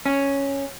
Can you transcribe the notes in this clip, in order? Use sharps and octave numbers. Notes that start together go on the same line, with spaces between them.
C#4